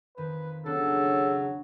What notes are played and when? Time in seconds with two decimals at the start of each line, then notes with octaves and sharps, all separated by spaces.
0.17 F2 D#3 B4
0.66 C#3 F#3 B3 D4 D#4 A4